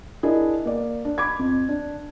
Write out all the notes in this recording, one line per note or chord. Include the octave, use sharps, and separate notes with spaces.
D4 E4 G#4 A#4 D#5
A#3 D5
D4
B5 D6 G#6
F2
D4